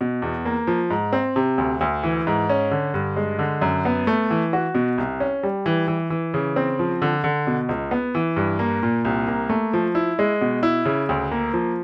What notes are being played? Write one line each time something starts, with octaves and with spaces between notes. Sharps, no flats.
B2
E2
A#3
F3
G#2
C4
C3
D2
D2
E3
G#2
C#4
D3
G2
G#3
D3
F#2
B3
A3
E3
F#4
B2
C2
C#4
G3
E3
E3
E3
C#3
C4
F3
D3
D3
B2
C#2
B3
E3
G2
A#3
A#2
C2
A#3
A3
F3
E4
G#3
B2
E4
C#3
D2
A#3
F3